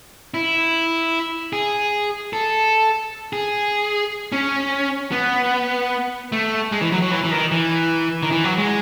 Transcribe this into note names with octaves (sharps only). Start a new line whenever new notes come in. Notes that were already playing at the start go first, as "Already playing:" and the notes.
E4
G#4
A4
G#4
C#4
B3
A3
G#3
E3
F#3
F#3
E3
E3
D#3
E3
D#3
E3
F#3
G#3